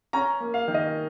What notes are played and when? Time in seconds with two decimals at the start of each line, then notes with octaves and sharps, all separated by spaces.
0.13 C#4 A#5
0.40 A#3
0.54 F5
0.68 D#3
0.74 D#5